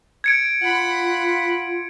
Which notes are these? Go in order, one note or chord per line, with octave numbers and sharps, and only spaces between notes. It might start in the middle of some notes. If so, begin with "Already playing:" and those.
G#6 C#7 D7
F4 F#5 B5